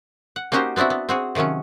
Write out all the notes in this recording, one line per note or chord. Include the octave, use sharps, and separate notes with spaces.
F#5
A#3 C#4 D#4 F#4 G4 C5
B3 C4 D4 E4 F#4
B3
C4 F#4 G#4
C3 D#3 F3 F#3 C#4